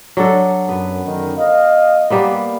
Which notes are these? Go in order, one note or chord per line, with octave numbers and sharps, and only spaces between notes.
F#3 D4 A4
F#2 B3
F#2 D3 D#3
D#5 F5
G3 A#3 B3